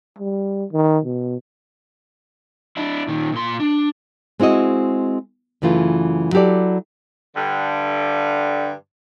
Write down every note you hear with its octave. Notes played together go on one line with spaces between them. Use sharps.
G3
D#3
B2
D4 E4
A#2 D#3
A#2 C6
D4
G#3 C4 E4 F#4 D#5
F#2 C#3 E3 A3 F4
F#3 E4 G4 A4 D5
G2 D3